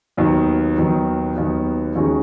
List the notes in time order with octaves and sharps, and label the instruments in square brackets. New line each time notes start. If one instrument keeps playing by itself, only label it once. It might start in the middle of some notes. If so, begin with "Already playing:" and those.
[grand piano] D#2 D#3 F#3 B3
D#2 D#3 F#3 B3
D#2 D#3 F#3 B3
D#2 D#3 G#3 C#4 F#4